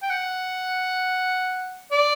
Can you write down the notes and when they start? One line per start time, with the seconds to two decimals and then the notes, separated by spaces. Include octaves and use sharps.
0.02 G5
0.10 F#5
1.91 D5